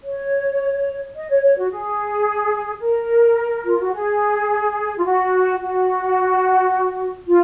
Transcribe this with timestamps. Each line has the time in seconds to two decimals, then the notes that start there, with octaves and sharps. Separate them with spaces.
0.04 C#5
1.15 D#5
1.29 C#5
1.42 C#5
1.57 F#4
1.71 G#4
2.81 A#4
3.65 F4
3.80 F#4
3.94 G#4
4.97 F4
5.04 F#4
5.60 F#4
7.28 F4